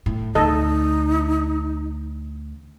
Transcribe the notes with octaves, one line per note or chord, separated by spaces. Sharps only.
A2
D2 D#4 A4 D#5